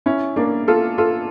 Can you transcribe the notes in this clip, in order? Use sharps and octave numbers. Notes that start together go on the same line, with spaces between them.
C#4 E4
A#3 D4
F4 A4
F4 A4